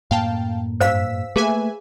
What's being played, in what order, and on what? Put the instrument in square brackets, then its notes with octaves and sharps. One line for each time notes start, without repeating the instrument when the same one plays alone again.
[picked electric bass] F#2 A2 A#3 [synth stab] F5 G5 A5
[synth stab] G2 E6 B6 [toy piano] C5 F5
[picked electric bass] A3 A#3 [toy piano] G#4 [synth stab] B4 E5 G#5